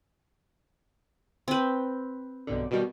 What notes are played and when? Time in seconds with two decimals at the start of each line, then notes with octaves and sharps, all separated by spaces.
1.48 C4 B4
2.47 B1 G2 D3
2.71 B2 D#3 G3